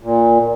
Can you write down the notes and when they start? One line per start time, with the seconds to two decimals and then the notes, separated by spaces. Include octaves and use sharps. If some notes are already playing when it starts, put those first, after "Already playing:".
0.03 A#2